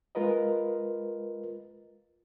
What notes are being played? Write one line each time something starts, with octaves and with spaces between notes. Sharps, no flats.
G#3 F4 A#4 B4 D#5